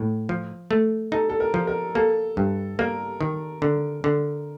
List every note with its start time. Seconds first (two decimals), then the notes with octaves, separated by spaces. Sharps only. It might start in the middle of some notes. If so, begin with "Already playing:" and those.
Already playing: A2
0.29 F3
0.71 A3
1.12 D#4 A4
1.29 A4
1.40 A#4
1.54 F3
1.67 A#4
1.95 A#3 A4
2.37 G2
2.79 A#3 A#4
3.21 D#3
3.62 D3
4.04 D3